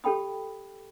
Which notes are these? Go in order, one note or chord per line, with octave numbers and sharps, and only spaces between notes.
G4 A4 G5 B5 D#6